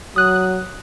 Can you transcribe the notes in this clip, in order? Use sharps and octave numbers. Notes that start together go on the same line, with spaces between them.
F#3 D#6 F#6